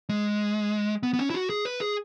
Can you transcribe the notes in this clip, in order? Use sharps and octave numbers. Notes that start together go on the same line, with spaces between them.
G#3
B3
B3
C#4
E4
F#4
G#4
B4
G#4